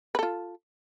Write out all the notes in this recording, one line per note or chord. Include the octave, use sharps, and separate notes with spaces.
F4 A4 B4